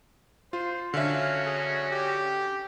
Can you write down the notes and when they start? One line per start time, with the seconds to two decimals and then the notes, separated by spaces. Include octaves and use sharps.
0.53 F4 C5
0.94 D3 C#4 F#4 E5 F5
1.46 G#4
1.91 G4